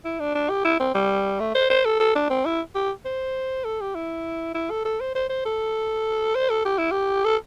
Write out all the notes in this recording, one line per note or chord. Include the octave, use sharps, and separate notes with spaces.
E4
D4
D4
G4
E4
C4
G3
A3
C5
C5
A4
A4
D4
C4
E4
G4
C5
A4
G4
E4
E4
A4
A4
C5
C5
C5
A4
C5
A4
G4
E4
G4
A4